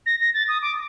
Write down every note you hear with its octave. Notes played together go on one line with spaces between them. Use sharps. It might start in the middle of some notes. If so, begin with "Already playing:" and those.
A#6
A#6
A6
D#6
D6